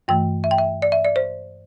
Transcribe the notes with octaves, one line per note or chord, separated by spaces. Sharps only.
G2 E3 A3 G5
E5
G5
E5
D5
E5
D5
C5